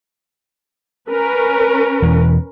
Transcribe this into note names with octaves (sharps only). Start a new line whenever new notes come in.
C#4 A#4 B4
E2 B2 E3